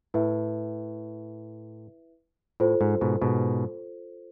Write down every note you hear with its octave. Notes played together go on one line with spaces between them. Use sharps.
A2 E4 B4 E5
A2 F4 A4 C5
G#2
G#2 B2
G#2 B2